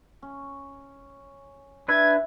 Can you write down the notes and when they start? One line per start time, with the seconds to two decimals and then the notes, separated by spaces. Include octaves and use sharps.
0.22 C#4
1.88 D4 E4 B4 E5 G#6